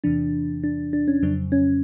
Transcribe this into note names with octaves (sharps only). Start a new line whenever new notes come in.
E2 C3 E3 D4
D4
D4
C#4
F2 C#3 F#3 D4
C#4